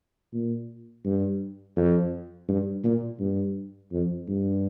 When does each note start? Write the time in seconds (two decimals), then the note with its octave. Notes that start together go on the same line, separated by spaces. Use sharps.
0.33 A#2
1.05 G2
1.76 F2
2.49 G2
2.84 A#2
3.20 G2
3.92 F2
4.29 G2